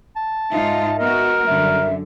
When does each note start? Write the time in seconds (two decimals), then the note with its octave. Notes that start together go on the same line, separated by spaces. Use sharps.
0.16 A5
0.51 G#2 D#4 F4 E5
0.99 B3 F#4 A#4 D#5
1.47 F#2 D3 G3 E5